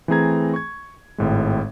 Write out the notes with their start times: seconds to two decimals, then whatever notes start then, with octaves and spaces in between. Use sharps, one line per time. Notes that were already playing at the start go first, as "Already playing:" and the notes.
0.08 E3 A3 C4 G#4 A#5 G#6
0.54 C#6 G#6
1.18 G#1 A2 G#3